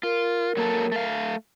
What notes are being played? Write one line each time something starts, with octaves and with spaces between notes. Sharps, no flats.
F4 A#4
F#3 A#3 A4
A3 F5